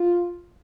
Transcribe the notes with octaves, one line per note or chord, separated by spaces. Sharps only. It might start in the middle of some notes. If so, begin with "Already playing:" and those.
Already playing: F4